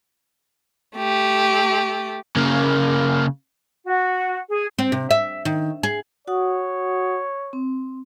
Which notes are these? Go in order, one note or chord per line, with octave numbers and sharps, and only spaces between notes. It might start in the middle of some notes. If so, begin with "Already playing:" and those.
A3 G4
C#3 A#3
F#4
G#4
C4
C3
E5
D#3
G#4
F#4 C#5 F#5 D#6
C4